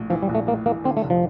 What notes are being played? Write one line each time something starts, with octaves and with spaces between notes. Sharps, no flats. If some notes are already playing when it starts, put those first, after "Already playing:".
Already playing: A#1 A2
E3 F3
G3
A#1
A3
A2 A#3
E3 A#3
D3 C4
A3
F1
F3